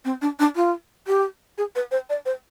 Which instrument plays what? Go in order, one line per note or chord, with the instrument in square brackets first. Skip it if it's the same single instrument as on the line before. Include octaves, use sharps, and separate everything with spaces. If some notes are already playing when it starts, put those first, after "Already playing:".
[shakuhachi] C4
D4
D4
F4
G4
G#4
B4
C5
D5
C5